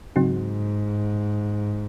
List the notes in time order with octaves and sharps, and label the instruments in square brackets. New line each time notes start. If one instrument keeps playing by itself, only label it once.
[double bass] G#2 [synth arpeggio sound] C#3 F#3 C4 D#4 F#4